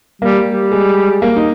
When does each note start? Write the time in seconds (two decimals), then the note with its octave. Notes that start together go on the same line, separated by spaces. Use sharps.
0.22 G3 A#3
0.47 G3
0.72 G#3
1.22 A#3
1.36 D#4